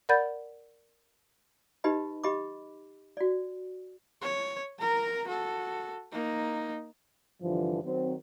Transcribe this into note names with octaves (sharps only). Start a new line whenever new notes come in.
A#4 D5 F#5 B5 G6 A6
D#4 G4 B4 D#5 B5
G4 D#5 B5 D6
F#4 D5
C#5
A#4 A#5
F#4 A4
A#3 D#4
G2 D3 E3 F3
D#3 F#3 C4